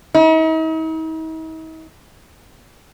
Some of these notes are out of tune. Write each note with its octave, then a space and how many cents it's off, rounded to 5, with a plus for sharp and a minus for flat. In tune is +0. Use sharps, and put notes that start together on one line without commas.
D#4 +45